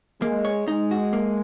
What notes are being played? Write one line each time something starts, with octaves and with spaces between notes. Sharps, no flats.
G#3 A#3
C#5
G#3 D#4
F#4
A#3